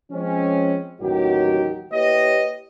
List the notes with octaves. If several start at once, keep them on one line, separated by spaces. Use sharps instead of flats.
F3 G#3 C4 C#4
A1 D#2 D#3 F#3 F#4 G4
A#3 E4 G4 B4 C#5 D#5